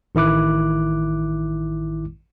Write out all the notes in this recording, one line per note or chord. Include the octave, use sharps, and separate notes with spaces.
A1 D#3 E4 D6 F#6